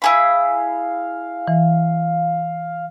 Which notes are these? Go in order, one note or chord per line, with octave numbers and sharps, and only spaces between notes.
E4 G#4 F5 B5
E3